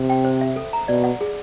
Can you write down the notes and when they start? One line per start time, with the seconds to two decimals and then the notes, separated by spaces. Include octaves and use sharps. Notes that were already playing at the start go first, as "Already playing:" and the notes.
Already playing: C3
0.10 G5
0.25 C5
0.41 E5
0.56 A4
0.73 A#5
0.88 B2 D5
1.04 F#5
1.21 G#4